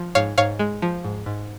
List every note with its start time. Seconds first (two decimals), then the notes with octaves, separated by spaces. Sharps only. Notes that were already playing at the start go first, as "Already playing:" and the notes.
Already playing: F3
0.15 G#2 C#5 F5
0.38 G#2 C#5 F5
0.59 G#3
0.82 F3
1.04 G#2
1.26 G#2